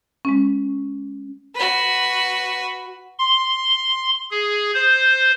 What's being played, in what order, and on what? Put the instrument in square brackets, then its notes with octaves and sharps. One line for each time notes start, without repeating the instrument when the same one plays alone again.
[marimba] G#3 C#4
[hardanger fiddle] F#4 B4
[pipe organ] C6
G#4
C5